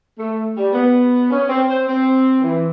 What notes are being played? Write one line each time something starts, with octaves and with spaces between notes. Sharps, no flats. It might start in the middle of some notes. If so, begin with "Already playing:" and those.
A3
G3
B3
C#4
C4
C5
C4
E3